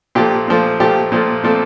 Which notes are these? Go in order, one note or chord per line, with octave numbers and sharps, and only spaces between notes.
A#2 F3 A3 G4
A#2 F3 A3
A#2 F3 A3 G4
A#2 F3 A3
A#2 F3 A3 C4 A4